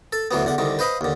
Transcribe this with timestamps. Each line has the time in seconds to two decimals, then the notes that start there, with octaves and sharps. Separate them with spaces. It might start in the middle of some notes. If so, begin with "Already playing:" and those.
0.13 A4
0.31 D2 E3 F#3 B3
0.45 E2 D3 F#5
0.58 C2 D3 D#3
0.79 B4 C5 D#5 F5 B5
1.01 D#2 D3